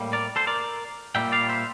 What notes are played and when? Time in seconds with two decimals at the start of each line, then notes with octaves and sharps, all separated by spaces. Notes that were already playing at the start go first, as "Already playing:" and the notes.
Already playing: A2 G3 A#3
0.13 A#4 D5
0.36 A4 C5
0.47 A#4 D5
1.15 A#2 G3 A#3 E5 G5
1.32 D5 F5
1.49 C5 E5